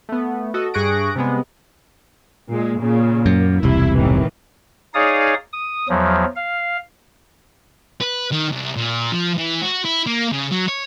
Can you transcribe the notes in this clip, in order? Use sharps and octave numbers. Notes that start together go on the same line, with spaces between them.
A3 B3
F#4 A4 D#5
G2 G#4 C#6 F#6 A#6 D7
C3 G3 G#3 B3
A#2 G#3
A#2 C#3
F#2 A#3
E1 C2 C3 E4
A2 D#3 E3
D#4 G#4 C#5 D5 F5 D#6
D#6
E2 F3 F#3
F5
B4
D#3
C2
A#2
F3
E3
F#4
E4
A#3
C#3
F#3
C#5